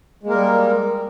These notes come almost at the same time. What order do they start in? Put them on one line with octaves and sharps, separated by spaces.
G#3 A#3 A#4 G3